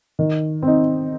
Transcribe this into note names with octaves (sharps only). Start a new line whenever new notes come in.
D#3
C4 D#4